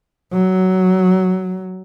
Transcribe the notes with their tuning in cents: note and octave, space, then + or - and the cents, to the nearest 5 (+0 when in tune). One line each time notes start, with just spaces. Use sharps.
F#3 +10